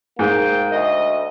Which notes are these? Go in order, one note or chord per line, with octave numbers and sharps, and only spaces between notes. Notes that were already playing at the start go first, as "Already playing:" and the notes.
G#2 A#3 G5
D2 D#5